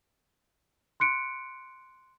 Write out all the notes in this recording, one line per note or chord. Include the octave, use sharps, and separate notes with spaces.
C6 F#6 C#7 D7